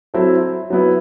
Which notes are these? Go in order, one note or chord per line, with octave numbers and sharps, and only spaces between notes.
F#3 C4 E4 A4
F#3 B3 E4